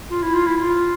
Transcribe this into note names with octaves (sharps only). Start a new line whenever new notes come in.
F4
E4
F4
E4
F4